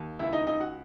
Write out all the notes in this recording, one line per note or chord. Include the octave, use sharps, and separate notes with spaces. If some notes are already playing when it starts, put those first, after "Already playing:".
Already playing: D#2
C#2 E4 E5
D#4 D#5
C#2 D#4 D#5
F#4 F#5